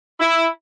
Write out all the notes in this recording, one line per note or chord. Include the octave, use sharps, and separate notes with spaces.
E4